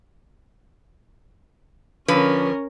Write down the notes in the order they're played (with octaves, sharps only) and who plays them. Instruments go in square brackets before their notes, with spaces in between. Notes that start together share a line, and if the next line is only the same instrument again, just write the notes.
[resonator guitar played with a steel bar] D3 F3 B4 [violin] C#4 A#4